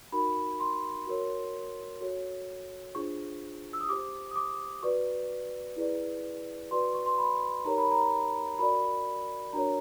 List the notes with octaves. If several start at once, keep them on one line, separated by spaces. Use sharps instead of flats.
D#4 F#4 A#4 B5
C6
F#4 A#4 C#5
F#4 A4 C#5
D4 F4 G#4 C5 C#6
E6
D#6
G4 C5 D6
D#6
D6
F#4 B4 D5 C#6
E4 G#4 B4 D5
F#4 B4 D5 C6
C#6
C6
B5
D#4 G4 A#4 C#5 A#5
B5
A#5
F#4 A#4 D5 B5
D4 F#4 A#4 C#5 A#5